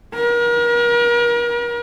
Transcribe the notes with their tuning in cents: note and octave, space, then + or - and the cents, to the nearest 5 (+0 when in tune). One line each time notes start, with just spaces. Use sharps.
A#4 +40